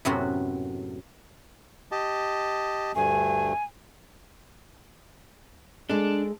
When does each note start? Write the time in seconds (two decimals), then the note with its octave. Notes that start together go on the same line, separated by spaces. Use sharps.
0.05 F#2 A2 C3 B3 C4 F#4
1.92 G4 D#5 A5
2.95 D2 G2 A3 G#5
5.90 G#3 D4 A4